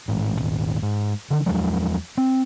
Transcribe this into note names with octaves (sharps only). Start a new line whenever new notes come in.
A1 G#2
D#1 G#1 D#2
G#2
D3 D#3
E2 F3 F#3 G#3
C4